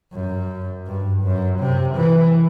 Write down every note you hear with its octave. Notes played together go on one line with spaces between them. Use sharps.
F#2
G2
F#2
C3
E3